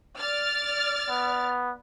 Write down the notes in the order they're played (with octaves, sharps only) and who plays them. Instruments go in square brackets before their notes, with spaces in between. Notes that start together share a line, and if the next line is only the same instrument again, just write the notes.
[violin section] D5 F6 A6
[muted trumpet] B3